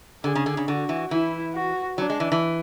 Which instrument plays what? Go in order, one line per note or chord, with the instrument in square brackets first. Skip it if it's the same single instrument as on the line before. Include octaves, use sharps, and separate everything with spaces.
[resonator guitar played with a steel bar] D3 [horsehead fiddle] G#4
[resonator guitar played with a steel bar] C#3
D3
C#3
[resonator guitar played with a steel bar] D3 [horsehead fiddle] F#4
[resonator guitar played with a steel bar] E3
[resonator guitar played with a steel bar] E3 [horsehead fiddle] E4
[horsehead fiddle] F#4
[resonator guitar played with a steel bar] F#3 [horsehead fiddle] D4
[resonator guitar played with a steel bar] G#3
E3
E3